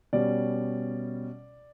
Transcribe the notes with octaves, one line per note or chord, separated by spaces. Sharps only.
B2 G3 C#4 D5